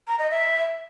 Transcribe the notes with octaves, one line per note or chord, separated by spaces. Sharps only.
A#5
D#5
E5